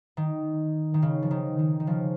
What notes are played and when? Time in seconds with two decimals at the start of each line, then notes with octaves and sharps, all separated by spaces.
0.17 D#3
0.94 D#3
1.02 C#3
1.22 F3
1.31 D#3
1.59 D#3
1.80 D#3
1.87 C#3 F3